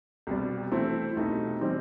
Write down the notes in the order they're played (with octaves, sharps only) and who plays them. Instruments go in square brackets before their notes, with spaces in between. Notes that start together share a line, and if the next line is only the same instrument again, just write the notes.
[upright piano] C2 B2 G3
E3 A3 C4 E4
C2 B2 A3 D#4
E3 G3 C4 D#4